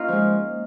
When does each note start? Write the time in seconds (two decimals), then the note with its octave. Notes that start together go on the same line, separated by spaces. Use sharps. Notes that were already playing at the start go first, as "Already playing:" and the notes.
Already playing: A#3 C#4 D#4 F4
0.08 F3 G#3